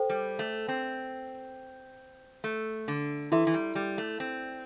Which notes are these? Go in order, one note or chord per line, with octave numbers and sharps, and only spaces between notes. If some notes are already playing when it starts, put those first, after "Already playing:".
Already playing: A4 C5 G5
G3
A3
C4
A3
D3
E3 E4 A4 E5 C6
E3
G3
G3
A3
C4